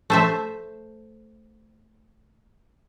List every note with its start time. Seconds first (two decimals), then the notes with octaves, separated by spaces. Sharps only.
0.10 A3 C5 E5